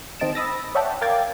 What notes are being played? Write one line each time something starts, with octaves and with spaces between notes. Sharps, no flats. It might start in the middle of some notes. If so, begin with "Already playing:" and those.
D#3 C4 D#5 A5 D7 E7
B5 D#6 E6 A6 A#6
C#5 D5 E5 F#5 G5 A5
A#4 F5 G5 D6 G#6 A6